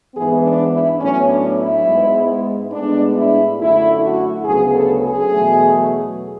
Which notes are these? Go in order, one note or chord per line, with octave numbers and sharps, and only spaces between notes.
G#2 E3 B3 G#4
D4
E4
A2 F#3 B3 C#4
D4
E4
G#2 G#3 B3
A2 G#3 B3 D4
E4
F#2 D3 A3 E4
F#4
D2 C#3 F#3 B3 G#4
A4
G#4
E2 B2 F#3 A3